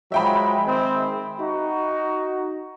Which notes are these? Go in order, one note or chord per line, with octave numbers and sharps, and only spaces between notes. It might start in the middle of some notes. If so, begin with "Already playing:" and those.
F3 F#3 G#3 E5 G5 B5
D#3 G#3 C4
D#4 F#4